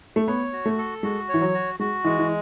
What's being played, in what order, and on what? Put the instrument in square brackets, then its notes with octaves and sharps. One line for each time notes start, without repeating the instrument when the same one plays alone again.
[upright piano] A3
[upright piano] B3 [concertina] C#5
[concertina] F#4
[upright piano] A3
[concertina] A4
[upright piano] G#3 [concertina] F#4
[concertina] C#5
[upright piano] E3
F#3
[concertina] F#4
[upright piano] G#3 [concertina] F#4
[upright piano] E3 [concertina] G#3
[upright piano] E3